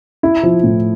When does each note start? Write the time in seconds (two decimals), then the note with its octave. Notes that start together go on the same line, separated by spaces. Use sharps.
0.23 E4
0.43 F3
0.63 A2